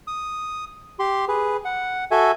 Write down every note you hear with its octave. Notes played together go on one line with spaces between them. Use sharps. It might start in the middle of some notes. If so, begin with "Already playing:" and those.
D#6
G4 C6
G#4 B4
F#5
F#4 A4 E5 G#5